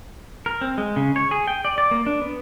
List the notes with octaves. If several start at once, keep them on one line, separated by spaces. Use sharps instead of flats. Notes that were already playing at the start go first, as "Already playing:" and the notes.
A#4
C4
G#3
C#3
C#5
G#4
G5
D5
D5
A#3
D4
B3